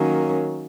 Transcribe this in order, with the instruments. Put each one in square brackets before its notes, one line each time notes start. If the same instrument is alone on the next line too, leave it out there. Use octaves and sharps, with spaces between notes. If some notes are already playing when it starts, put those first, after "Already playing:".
Already playing: [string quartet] D#3 F#3 A#3 C#4